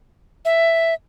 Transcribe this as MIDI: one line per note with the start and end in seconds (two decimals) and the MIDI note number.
0.45 0.94 76